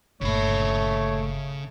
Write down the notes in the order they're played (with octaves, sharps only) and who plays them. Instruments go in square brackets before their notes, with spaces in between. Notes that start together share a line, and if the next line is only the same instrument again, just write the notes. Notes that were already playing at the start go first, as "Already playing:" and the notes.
[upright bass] G1 A#2 [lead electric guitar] C#3 B5 [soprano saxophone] A3 [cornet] C#5